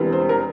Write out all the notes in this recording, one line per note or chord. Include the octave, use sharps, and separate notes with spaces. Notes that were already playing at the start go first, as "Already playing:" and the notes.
Already playing: E1 E2 C3 E3 G3
C5
A#4